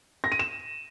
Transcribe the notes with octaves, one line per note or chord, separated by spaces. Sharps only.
A#6
D#7
E7